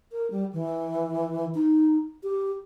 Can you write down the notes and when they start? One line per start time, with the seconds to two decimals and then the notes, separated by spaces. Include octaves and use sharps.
0.12 A#4
0.31 G3
0.53 E3
1.55 D#4
2.23 G4